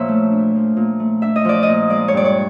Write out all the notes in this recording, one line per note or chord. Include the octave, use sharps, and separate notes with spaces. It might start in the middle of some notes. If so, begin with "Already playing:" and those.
Already playing: A#2 F3 D4 C#5 E5
A3
D4
F3
A#2
A3
D4 E5
D#5
F3 D5
D#5
A#2
G#3 D5
C#5
G2 D5
C#5